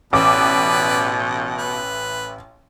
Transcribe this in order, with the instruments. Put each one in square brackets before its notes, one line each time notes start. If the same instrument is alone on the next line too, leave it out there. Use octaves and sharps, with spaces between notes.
[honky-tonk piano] A1 D6 [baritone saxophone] B2 [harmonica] B4 D5
[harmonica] B4